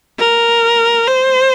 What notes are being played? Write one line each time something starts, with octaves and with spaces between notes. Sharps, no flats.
A#4
C5